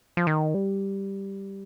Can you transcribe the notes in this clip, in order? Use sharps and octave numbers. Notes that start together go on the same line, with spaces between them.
F3
D#3
G3